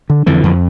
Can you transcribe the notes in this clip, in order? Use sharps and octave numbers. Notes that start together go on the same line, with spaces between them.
D3
F2 D3 E3
F2